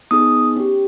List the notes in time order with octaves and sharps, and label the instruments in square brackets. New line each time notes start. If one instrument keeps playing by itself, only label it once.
[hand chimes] B3 D#4 G#4 D#6
C#4 G4